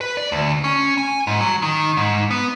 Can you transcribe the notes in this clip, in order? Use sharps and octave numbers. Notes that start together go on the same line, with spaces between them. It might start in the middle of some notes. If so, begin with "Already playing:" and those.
B4
D5
D2
C#4
G#5
G#2
F#3
D#3
G#2
B3